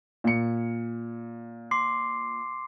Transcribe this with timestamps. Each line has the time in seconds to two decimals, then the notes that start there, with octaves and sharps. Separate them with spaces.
0.24 A#2 C#7
1.71 C6 D6 C7